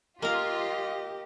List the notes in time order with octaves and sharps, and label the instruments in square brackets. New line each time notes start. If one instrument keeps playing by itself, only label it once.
[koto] A#3 A#4 [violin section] F4 [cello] G4 [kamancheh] D#5